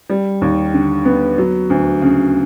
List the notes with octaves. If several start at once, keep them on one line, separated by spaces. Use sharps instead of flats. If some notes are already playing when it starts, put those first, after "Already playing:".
G3
D#2
D3
B3
F#3
D2
C#3